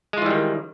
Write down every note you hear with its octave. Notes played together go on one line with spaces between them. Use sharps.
D#3 E3 G3 G#3 F4